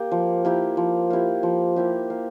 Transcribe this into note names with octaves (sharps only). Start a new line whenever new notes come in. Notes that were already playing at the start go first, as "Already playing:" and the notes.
Already playing: A#3 G4
F3
A#3 E4 G4
F3
A#3 E4 G4
F3
A#3 E4 G4
A#3